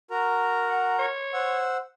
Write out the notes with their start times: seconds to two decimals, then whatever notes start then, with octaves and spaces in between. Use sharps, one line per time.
0.11 F#4 A#4 A#5
0.69 F#5
0.99 C#5
1.34 C5 F#5 E6